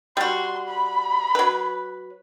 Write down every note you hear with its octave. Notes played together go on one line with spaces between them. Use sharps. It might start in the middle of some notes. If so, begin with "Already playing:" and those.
G3 F#4 C6
B5
F#3 B4